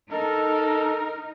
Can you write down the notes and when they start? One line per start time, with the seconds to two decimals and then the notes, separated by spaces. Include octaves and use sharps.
0.11 D#4 A4 A#4